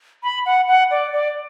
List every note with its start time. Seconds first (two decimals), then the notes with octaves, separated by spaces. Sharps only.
0.23 B5
0.46 F#5
0.68 F#5
0.91 D5
1.13 D5